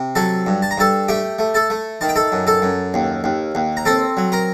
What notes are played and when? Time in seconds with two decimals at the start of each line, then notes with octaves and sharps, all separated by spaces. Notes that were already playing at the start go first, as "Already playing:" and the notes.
Already playing: C3
0.15 F#3 A4 A5
0.46 G2
0.62 A5
0.71 A#5
0.77 G2 A4 A5
1.08 A3 G4 G5
1.39 A3
1.54 A4 A5
1.70 A3
2.01 D#3 A5
2.09 G5
2.16 A4 A5
2.32 F#2
2.47 A4 A5
2.62 F#2
2.94 D#2
3.24 D#2
3.55 D#2
3.77 A#5
3.85 C4 A4 A5
4.17 F#3
4.32 A#4 A#5